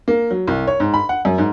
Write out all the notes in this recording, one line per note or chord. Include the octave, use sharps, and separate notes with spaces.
A#3
F#3
C2
C#5
G#2
B5
F#5
F#2
G#2